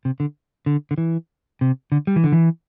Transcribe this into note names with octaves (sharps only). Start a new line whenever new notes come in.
C3
D3
D3
D3
E3
C3
D3
G3
E3
D3
E3